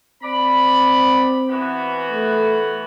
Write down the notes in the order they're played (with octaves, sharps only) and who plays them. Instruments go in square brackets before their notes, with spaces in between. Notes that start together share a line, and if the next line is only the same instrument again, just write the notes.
[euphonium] C4 [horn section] D5 B5
[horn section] E3 B3 F#4
[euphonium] A3